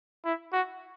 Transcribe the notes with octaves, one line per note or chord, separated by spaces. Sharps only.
E4
F#4